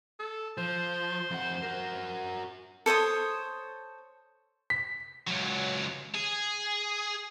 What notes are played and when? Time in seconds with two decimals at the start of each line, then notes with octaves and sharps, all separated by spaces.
0.19 A4
0.58 F3 C5
1.31 F2 F#5
1.63 F#4 A#4
2.86 A4 C5 C#5 D#6
4.70 B6
5.28 C#2 F#3
6.14 G#4